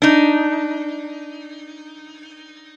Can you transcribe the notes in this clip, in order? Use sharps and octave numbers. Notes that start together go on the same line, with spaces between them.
D4 D#4